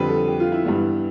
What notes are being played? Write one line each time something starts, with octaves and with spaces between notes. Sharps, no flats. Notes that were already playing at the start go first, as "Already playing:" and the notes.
Already playing: F2 D3 G3 C4 B4
A4
G4
F4
E4
G2 E3 G3 B3